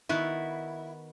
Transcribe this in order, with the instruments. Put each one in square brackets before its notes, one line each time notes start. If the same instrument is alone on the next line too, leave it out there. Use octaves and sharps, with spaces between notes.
[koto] D#3 B3 F#4 [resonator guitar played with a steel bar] E4